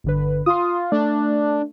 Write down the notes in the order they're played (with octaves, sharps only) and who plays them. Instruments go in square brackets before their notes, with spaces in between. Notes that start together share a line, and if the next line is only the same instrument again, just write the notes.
[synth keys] G1 D3 B4
[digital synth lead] F4 [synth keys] C6 D#6
[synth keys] A3 [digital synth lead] D4